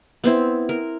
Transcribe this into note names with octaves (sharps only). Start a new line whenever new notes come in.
B3 C4 E4
A#4